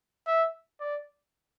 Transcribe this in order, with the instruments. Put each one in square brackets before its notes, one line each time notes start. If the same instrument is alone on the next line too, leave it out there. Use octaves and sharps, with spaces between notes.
[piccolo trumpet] E5
D5